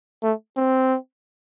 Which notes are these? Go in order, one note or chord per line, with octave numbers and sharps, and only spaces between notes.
A3
C4